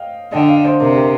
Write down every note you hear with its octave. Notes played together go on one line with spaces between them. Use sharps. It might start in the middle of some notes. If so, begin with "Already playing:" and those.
Already playing: D#5 F5 G5
D3 D#5 G5
D5 F5
C5 D#5
C3 A#4 D5
G4 A#4